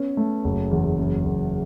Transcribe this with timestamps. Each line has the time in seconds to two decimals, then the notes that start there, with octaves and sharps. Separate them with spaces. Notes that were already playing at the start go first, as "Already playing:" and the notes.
Already playing: B3 C#4
0.17 A3
0.44 F#1
0.71 E2
0.98 F#1
1.25 F#1